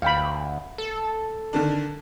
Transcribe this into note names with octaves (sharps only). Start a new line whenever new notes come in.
D2 F5 G5 B5
A4
D3 D#3 D4